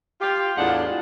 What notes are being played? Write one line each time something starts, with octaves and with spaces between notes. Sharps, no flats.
F4 G4
E2 A2 G#3 D4 F4 F#5